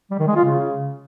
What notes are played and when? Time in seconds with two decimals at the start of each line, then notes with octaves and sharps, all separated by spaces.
0.11 G3
0.19 D#3
0.27 G#3
0.36 F4
0.44 C#3